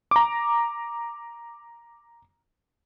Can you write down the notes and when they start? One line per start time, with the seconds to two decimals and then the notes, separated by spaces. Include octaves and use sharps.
0.11 A#5 D6